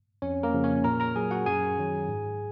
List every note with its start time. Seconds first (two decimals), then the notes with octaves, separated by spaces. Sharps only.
0.22 F2 C#4 C#5
0.43 A#3 A#4
0.54 C#3 F3
0.64 C#4 C#5
0.84 A#2 A#4 A#5
1.00 A#4 A#5
1.16 F#3 G#4 G#5
1.31 F#4 F#5
1.46 F#2 G#4 G#5
1.78 D#3 F#3
2.08 G#2